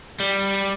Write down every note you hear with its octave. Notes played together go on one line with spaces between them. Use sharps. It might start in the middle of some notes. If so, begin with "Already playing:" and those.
G3